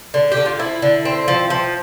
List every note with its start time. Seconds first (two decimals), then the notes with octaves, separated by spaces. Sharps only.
0.14 D3
0.32 G4
0.37 D3
0.46 F4
0.59 F3 E4
0.82 D3
1.05 C4
1.28 F3
1.50 F3